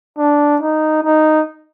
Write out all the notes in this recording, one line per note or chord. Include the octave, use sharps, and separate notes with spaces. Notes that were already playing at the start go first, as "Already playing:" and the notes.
D4
D#4
D#4